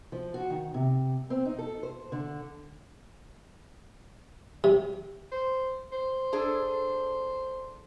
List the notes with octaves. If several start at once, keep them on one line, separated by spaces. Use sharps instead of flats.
F3
F#4
D#3
C3
C4
D#4
A4
C5
D3
C3
C5
C5
D4 G#4 A4